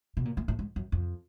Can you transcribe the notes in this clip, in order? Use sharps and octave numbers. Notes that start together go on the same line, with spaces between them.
B2
A#2
A2
A2
G#2
F#2
F2